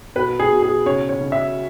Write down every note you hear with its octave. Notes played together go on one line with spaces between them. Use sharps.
B2 B4
G#4
B2
G#4
C#3 C#5
C#5
C#3
E5